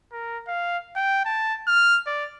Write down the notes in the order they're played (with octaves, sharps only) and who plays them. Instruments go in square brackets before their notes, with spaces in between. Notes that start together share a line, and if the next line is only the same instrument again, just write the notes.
[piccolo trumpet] A#4
F5
G5
A5
F6
D5